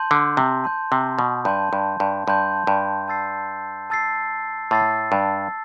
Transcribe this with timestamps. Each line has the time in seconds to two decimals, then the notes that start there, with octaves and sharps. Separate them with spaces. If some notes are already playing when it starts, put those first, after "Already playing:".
Already playing: A5 C6 G6
0.11 D3
0.37 C3
0.64 A5 C6 G6
0.92 C3
1.19 B2
1.45 G2 A5 C6 G6
1.73 G2
2.00 G2
2.27 G2 A5 C6 G6
2.67 G2
3.08 A5 E6 A6 C7
3.90 A5 E6 A6 C7
4.71 A2 A5 E6 A6 C7
5.12 G2